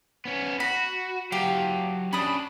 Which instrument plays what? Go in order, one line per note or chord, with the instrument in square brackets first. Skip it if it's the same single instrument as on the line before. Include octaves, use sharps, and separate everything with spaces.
[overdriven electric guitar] B3 C#4
[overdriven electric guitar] F#4 [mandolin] B5
[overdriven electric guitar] F#3 F5 [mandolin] G4
[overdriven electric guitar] C#4 D4 [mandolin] B5 D#6